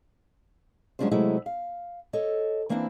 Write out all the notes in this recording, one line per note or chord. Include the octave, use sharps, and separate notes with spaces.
F#3 G#3 C#4 D4 F4 C5
C3 F#3 G#3 A3 E4
F5
A4 C#5 D#5
E3 A#3 C4 D4 E4